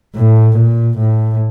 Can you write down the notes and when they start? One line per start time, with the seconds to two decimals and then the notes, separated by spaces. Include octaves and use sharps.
0.16 A2
0.56 A#2
0.98 A2